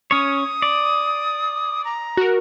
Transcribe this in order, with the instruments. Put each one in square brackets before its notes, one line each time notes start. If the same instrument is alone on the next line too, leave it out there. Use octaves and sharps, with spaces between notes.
[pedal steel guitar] C#4 C#5 [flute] D#6
[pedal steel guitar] D5
[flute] A#5
[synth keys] F#4 A#4